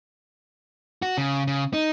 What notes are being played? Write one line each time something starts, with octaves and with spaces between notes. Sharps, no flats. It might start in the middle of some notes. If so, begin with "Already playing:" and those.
F#4
C#3
C#3
D#4